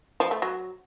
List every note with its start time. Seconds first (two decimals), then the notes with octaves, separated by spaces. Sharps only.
0.20 F3
0.31 A3
0.42 F#3